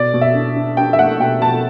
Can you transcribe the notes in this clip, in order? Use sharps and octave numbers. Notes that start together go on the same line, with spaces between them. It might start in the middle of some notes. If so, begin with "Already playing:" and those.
Already playing: B2 D5
B2
E5
D4
D4
D4 G5
E5
A3 F#5
B2 G5
B2 A5